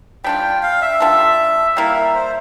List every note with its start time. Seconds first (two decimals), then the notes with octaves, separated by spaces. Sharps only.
0.24 G3 D4 F4 G5
0.63 F5
0.82 E5
1.00 G3 D4 F4 A4
1.77 G3 A#3 E4 F5
1.95 E5
2.15 C5